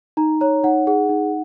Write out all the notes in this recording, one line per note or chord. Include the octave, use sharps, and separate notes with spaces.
D#4 A#5
C#5 A#5
D#4 F#5
G#4 F#5
D#4